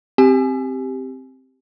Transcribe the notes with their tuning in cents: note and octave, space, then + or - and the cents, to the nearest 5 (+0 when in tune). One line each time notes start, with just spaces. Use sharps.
C4 +0 G4 +0 G#5 +25